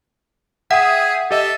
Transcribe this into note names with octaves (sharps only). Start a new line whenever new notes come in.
G#4 E5 F#5 G5 D#6
G4 A4 D#5 E5